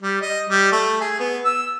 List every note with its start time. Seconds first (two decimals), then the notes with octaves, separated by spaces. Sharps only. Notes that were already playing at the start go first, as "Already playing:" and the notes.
0.02 G3
0.22 D#5
0.50 G3
0.72 A3
1.01 G#4
1.20 B3
1.45 E6